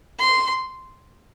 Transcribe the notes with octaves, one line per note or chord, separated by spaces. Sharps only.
C6